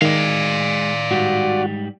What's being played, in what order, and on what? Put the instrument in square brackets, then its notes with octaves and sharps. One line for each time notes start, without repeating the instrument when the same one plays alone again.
[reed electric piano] D#3 [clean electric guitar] G#3 [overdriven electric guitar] D5 F5
[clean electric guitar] G#2 G3 [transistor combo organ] F#4